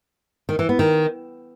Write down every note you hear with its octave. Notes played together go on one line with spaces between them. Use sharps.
D#3
E3
B3
D#3